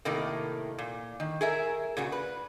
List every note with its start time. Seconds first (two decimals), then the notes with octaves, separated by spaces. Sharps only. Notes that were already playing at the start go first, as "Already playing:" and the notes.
0.05 A2 C3 D#3 A3 A#3
0.78 A#2
1.20 D#3
1.41 G#4 A#4 E5
1.97 A#2 C#3 F#4
2.12 B4